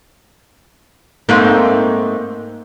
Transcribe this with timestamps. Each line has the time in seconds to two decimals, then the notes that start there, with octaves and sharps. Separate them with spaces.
1.29 G#2 A3 A#3 C4 D#4